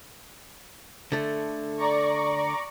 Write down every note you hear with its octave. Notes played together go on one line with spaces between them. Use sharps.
D3 A3
D5 A#5 C#6